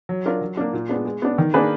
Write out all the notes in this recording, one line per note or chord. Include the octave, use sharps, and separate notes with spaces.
F#3
D4 F4 A#4
F#3
A#3 D4
A#2
G#3 B3 D4
G#3
B3 D4
D#3
A#3 D4 G#4 B4